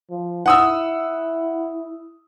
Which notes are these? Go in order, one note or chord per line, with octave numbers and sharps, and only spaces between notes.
F3
E4 F#5 D#6 E6